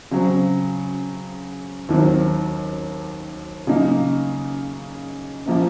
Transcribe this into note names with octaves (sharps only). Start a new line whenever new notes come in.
C#3 F#3 C4
D#2 D#3 F#3 C4
C#3 F#3 A#3 D#4
A#2 F3 A#3 C#4